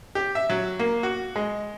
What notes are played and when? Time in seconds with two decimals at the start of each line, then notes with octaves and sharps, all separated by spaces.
0.15 G4
0.35 E5
0.50 F#3
0.79 A#3
1.03 F#4
1.36 G#3